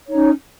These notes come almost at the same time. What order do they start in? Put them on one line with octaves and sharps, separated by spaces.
C#5 D#4 C#4